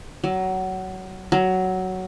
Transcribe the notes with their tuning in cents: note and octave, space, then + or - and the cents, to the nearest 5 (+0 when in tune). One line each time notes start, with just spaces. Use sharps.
F#3 +20
F#3 +10